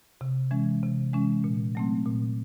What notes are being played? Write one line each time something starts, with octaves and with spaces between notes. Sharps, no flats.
C3
E3 G#3 C#4
C3
E3 G#3 C#4
A#2
F#3 A3 C4
A#2